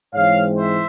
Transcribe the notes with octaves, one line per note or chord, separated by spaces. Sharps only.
G#2 E3 G#3 C4 E4 C#5 F5
C5 E5